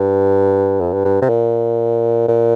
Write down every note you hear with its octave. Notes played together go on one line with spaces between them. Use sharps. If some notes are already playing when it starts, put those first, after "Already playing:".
Already playing: G2
F2
G2
G2
C3
A#2
A#2